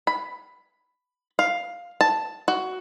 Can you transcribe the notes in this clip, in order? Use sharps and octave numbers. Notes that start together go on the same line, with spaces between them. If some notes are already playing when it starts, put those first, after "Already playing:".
B5
F5
A5
F#4